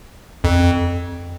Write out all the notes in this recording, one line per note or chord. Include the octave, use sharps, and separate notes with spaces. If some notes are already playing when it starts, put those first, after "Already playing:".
F2